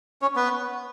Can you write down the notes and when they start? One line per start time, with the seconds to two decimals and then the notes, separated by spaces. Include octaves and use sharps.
0.22 C#4 C#5
0.36 B3 B4